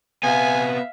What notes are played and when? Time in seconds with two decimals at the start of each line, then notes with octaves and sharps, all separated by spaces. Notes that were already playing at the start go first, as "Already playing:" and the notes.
0.23 C3 B3 E5 F5 G#5